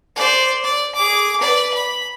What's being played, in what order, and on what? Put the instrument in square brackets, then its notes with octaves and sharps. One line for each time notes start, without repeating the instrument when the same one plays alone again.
[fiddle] C5 D5
D5
G#4 D6
B4 D5
B5